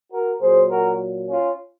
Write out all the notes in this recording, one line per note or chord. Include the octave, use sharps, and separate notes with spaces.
F#4 A#4
A#2 F#3 G#4 C5
F#4 A#4
C#4 F4